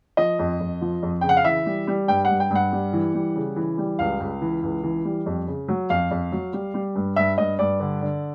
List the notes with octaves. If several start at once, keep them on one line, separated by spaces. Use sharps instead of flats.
F3 D#5
F2
F2
F3
F2
C#3 G5
F#5
F5
E3 E5
G3
G3
G2 G5
G2 F#5
G5
G2 F#5
G3
E3
G3
C#3
E3
G3
C#2 F5
C#2
E3
C#2
E3
G3
F2
C#3
F#3
F2 F5
F2
F#3
G3
G3
G2
G2 E5
G2 D#5
G2 D5
D3
D3